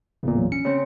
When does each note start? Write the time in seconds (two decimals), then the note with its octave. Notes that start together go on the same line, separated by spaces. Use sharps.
0.23 A1 E2 A#2 C#3
0.37 F#3
0.52 C#4 C#7
0.65 C#3 C4